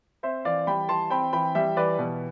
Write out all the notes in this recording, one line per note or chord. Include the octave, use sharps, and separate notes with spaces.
C4 C5 E5
E3 D5 F5
G3 G5 B5
E3 A5 C6
C4 G5 B5
E3 G5 B5
G3 E5 G5
E3 B4 D5
B2